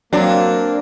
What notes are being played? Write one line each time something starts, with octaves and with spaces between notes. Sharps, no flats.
F#3 A#3 C4 D4